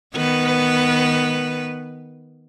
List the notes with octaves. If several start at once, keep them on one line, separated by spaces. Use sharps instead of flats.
D#3 B3 B4